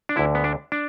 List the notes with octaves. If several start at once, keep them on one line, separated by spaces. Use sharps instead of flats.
D4
D2 D3 E4
B3
D4
D4